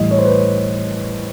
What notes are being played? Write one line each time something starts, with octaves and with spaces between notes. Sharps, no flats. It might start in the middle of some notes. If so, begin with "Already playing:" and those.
Already playing: A2 E3 G3 D#5
C#5
C5
B4